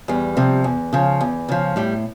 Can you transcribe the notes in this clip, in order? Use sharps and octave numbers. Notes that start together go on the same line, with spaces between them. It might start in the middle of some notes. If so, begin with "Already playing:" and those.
E2 G3
C3 F3
E2
C#3 F3
E2
C#3 F3
A2 G3